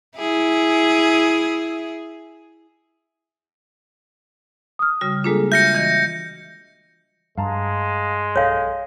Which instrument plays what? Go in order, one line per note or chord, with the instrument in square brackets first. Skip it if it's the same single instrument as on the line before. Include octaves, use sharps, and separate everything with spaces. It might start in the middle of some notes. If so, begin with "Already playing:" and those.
[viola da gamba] E4 G#4
[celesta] D#6 F6
[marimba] C#3 G3 F#4
[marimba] G#3 A#3 D4 [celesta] F4 G#4 A4
[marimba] F4 F#4 [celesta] E5 [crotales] G6 A#6 C#7
[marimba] E3 D#5
[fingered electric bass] G2 [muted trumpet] G#3 [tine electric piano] F5 A5 A#5
[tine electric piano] B1 A4 [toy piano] C#5 F5